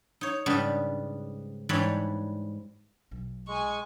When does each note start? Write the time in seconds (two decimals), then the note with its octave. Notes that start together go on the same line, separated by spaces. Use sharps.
0.21 D#4 C#5
0.46 G#2 C#3 G3 B3 D4
1.69 G#2 E3 G3 D4 C#5 B5
3.11 B1
3.48 G#3 G#5 C#6